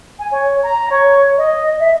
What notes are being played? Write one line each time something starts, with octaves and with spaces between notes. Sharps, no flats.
G#5
C#5
A#5
C#5
D#5
E5